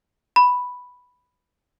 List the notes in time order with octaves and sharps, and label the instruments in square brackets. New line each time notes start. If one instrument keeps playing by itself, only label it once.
[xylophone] B5